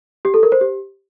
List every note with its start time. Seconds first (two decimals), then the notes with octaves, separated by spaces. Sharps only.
0.25 G4
0.34 A4
0.43 A#4
0.52 C5
0.61 G4